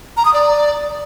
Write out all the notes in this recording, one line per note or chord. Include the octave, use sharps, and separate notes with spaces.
A#5
D#6
D5